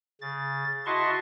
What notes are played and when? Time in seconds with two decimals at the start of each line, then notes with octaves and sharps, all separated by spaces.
0.21 C#3 A6
0.86 E4 F#4 D#5 A5 C6 C#6